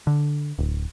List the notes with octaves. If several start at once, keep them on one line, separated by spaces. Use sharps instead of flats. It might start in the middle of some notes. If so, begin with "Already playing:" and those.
D3
D1